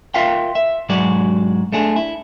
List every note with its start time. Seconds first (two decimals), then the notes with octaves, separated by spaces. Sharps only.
0.14 F4 A#4 E5 F5 G5
0.55 E5
0.89 G#2 F#3 G#3 F#4 D5
1.72 A3 D4 G#4
1.96 E4